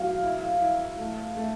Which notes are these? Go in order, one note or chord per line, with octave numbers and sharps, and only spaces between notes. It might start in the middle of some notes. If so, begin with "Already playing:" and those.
Already playing: F#3 F5
E4
E4
A3
A3